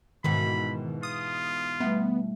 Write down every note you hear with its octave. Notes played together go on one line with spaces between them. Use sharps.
G#2 B2 D#3 E3 B5
F4 D#6
G3 A3 B3 E5